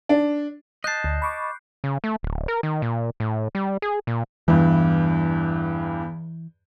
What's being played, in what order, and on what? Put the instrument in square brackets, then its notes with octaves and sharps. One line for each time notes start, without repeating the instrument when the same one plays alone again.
[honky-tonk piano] D4
[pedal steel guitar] D#5 A5 [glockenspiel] F#6 G6 C7
[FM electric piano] D2
B5 C#6 D6
[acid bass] C#3
A3
D1
A#4
D#3
A#2
A2
G3
G#4
A#2
[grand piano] E2 G2 [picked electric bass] E3